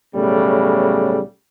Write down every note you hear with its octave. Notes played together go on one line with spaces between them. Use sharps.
B1 A2 C#3 G3